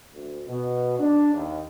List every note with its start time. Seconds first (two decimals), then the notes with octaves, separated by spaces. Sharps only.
0.13 D2
0.47 B2
0.99 D4
1.34 D#2